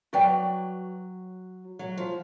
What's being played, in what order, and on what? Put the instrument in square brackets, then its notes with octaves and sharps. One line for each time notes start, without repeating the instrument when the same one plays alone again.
[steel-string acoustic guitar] F#3 [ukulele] F#4 B4 D5 G5
[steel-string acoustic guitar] F#3
F3